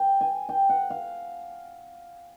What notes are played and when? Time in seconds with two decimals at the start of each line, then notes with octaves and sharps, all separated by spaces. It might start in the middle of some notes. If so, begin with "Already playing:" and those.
Already playing: G5
0.21 G#5
0.49 G5
0.69 F#5
0.90 F5